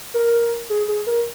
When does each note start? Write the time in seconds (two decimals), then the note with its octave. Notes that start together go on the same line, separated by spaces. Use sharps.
0.14 A#4
0.70 G#4
0.88 G#4
1.07 A#4